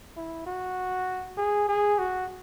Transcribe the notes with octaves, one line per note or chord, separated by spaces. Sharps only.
E4
F#4
G#4
G#4
F#4